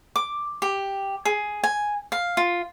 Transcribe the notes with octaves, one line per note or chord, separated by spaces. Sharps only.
D6
G4
G#4
G#5
F5
F4